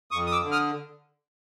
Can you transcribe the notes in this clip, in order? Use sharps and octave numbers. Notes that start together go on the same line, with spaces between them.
F2 C#6 D#6
D#6
D6 E6
D3
D#6 F6